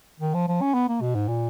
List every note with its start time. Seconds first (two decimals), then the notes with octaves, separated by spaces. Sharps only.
0.20 D#3
0.34 F3
0.48 F3
0.61 C#4
0.74 B3
0.89 A#3
1.01 B2
1.15 G#2
1.29 A#2